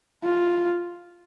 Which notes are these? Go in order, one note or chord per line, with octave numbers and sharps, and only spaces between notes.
F4